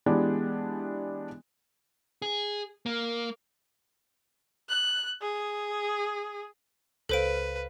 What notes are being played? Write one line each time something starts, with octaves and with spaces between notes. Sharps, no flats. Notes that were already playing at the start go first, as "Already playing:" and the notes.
E3 G#3 B3 D4 G4
G#4
A#3
F#6
G#4
C#2 A4 B4 C5 F5 D7